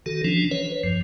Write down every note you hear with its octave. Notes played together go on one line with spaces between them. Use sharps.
D#3 F#4 A4
E3 F3 C#4 D4
B4 C#5
G2 F3